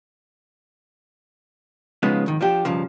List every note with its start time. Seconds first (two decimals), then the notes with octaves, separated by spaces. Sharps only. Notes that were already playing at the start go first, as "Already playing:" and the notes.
2.03 C#3 F3 G#3 B3 D#4
2.26 F2 G#2 D#3
2.41 F3 D4 G4
2.65 B1 G2 C#3 F3